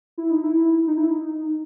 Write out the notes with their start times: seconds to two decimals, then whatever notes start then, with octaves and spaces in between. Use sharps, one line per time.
0.18 E4
0.31 D#4
0.44 E4
0.87 D#4
0.97 E4
1.08 D#4